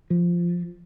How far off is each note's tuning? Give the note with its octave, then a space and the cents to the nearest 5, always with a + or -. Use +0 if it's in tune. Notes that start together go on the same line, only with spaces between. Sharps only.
F3 -5